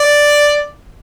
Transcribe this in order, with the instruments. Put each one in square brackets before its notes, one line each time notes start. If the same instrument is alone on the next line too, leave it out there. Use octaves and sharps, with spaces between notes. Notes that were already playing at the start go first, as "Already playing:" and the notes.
Already playing: [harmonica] D5